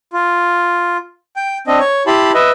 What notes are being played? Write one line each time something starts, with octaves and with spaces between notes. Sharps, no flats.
F4
G5
C4 D4 D#5
C#5
E4 G4 A5 B5 C6
B4 D#5 E5